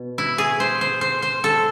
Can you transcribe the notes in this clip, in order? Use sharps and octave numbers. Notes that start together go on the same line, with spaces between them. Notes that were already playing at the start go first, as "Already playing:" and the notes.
Already playing: B2
E4
G#4
C5
C5
C5
C5
A4